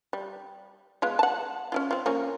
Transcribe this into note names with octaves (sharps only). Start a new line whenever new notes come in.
G3
G#3 B3 F4
F#5 A5
C#4 E4 F4
C4 F4
F3 A#3 C#4